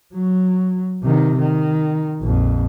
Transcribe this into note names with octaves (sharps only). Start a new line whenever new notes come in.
F#3
C3 D#3
D#3
A#1 F2